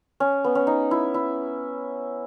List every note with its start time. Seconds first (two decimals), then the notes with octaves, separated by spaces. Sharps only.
0.20 C#4
0.44 B3
0.55 C#4
0.67 D#4
0.91 E4
1.14 E4